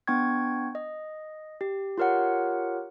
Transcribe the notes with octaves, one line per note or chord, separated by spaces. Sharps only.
B3 D4 G5 C#6 G#6
D#5
G4
F4 G4 A#4 C#5 F#5